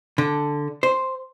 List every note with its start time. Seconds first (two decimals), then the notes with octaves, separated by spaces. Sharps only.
0.18 D3
0.83 C5